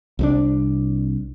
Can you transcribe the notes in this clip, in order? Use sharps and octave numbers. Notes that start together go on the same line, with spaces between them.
C2 G3 D4